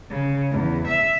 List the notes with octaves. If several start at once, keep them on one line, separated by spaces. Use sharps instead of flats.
C#3
E2
E5